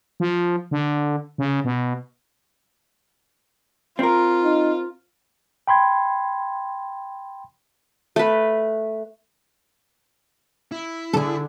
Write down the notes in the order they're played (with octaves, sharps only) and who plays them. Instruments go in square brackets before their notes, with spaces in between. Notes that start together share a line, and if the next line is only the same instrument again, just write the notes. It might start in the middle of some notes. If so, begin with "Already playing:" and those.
[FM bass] F3
D3
C#3
B2
[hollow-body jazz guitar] C4 A#4 [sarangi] F4
[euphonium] D#4
[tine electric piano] G5 B5 C6 G#6
[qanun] A3 B4
[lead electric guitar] E4
[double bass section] D3 [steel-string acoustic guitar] G#4 A4